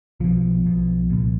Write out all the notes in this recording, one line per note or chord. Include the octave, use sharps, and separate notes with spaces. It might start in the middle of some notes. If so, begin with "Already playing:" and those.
B1 B2 F3
B1 B2
C2 A#2